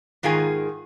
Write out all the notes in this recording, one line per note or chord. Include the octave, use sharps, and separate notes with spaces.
G#2 D#3 F4 G#4 G#5